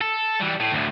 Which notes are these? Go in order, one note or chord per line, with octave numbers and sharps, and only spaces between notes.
A4
E3 G3
A2
D2 A2